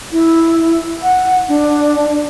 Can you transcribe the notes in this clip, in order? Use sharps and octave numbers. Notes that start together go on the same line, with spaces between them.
E4
F#5
D4